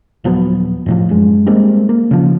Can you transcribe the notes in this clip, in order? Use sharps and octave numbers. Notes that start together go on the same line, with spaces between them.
D#1 F3 F#3 B3
F2 A2 F3
F#2 G#3
G3 G#3 A#3 C4
A#3
C#3 F3